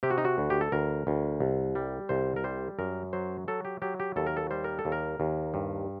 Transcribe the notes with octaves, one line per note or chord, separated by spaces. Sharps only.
C3 G4
F#4
D#4
F#4
D2
G4
A4
D2 A#4
D2
C2
G3
C2 C5
A#4
G3 C5
F#2 A#4
F#3 C5
F#3 A4
G4
F#3 G4
G4
D#2 A4
A#4
A4
G3 C5
A#4
A4
D#2
A#4
D#2
G2